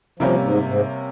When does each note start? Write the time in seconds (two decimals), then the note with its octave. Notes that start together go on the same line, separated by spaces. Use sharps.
0.20 C3 F3 G3 A#3 C#4
0.42 G#2
0.65 G#2